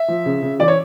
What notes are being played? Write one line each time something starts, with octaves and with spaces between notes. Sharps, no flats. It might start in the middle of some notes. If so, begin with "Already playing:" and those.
Already playing: E5
F3
C#3
C#3
E3 D5
C#5